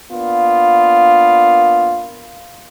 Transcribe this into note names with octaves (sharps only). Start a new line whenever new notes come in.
A#3 B3 D4 F4